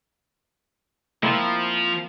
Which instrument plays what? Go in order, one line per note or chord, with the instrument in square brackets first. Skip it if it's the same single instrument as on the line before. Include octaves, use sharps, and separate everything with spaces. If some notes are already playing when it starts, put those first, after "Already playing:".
[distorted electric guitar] F3 [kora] A#3 C4 E4